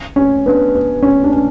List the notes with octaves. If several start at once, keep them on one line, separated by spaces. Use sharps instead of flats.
C#4
B3 D4
B3
C#4
D4
C#4